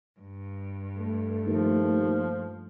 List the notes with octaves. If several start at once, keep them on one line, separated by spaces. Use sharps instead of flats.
G2
A3
D#2 F3